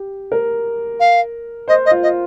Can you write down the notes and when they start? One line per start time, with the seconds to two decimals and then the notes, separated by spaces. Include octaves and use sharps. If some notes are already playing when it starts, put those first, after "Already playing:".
Already playing: G4
0.32 A#4
1.00 F5
1.68 C5 D#5
1.85 D#5
1.91 F4
2.02 D#5